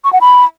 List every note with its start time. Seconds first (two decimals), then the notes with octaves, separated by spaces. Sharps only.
0.04 C#6
0.13 F#5
0.21 B5